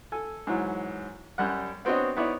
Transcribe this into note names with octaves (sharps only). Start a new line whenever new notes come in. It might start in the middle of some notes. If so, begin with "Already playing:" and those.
A4 G#5
G#2 E3 F#3
F#2 G3 F#5
B3 C4 D4 F#4 C#5 D#5
B3 D#4 E4 C#5 D5